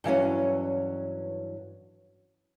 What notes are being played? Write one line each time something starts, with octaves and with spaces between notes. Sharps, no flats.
G2 E3 F#3 C#4